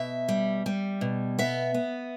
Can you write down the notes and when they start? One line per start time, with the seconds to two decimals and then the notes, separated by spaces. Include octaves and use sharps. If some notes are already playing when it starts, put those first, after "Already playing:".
Already playing: B2 E5
0.29 G3
0.66 G3
1.01 B2
1.39 B3 E5
1.74 B3